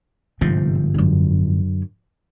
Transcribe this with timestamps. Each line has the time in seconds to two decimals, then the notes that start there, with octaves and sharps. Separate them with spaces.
0.41 G1 G#2 C3 F3
0.94 F#2 D3